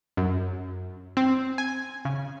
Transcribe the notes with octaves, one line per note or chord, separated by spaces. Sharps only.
F#2
C4
G#5
C#3